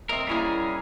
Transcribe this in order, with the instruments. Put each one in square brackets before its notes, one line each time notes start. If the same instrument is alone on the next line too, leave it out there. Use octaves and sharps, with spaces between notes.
[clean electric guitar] C4 A#4 [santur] D#5 E5
[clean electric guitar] G3 C#4 G#4 [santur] A#3 E4 A#4